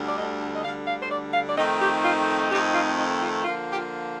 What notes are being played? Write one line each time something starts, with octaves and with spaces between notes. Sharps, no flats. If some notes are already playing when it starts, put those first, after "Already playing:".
Already playing: D2 D3 G3
D5
D#5
D#5
D2 D3 G3 F5
F5
C5
D5
F5
D5
F2 D#3 A3 C4 D#4 D#5
G4
F4
F2 D#3 A3 C4 D#4 G4
F4
D#4
F4
D3 F3 A#3 F4
G4
F4